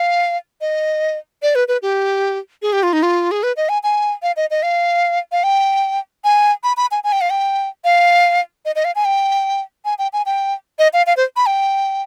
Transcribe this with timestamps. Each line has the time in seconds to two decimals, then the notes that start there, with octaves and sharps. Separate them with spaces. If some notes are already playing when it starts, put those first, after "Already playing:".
Already playing: F5
0.61 D#5
1.42 D5
1.55 B4
1.68 B4
1.82 G4
2.62 G#4
2.73 G4
2.83 F4
2.93 D#4
3.03 F4
3.31 G#4
3.43 B4
3.57 D#5
3.69 G#5
3.83 G#5
4.23 F5
4.37 D#5
4.51 D#5
4.63 F5
5.32 F5
5.44 G5
6.24 G#5
6.64 B5
6.77 B5
6.91 G#5
7.04 G#5
7.12 G5
7.21 F5
7.30 G5
7.84 F5
8.65 D#5
8.76 D#5
8.85 F5
8.95 G#5
9.05 G5
9.85 G#5
9.99 G5
10.13 G#5
10.26 G5
10.79 D#5
10.93 F5
11.07 F5
11.17 C5
11.36 B5
11.46 G5